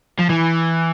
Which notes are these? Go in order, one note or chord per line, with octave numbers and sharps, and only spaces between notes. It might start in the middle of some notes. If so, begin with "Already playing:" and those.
F3
E3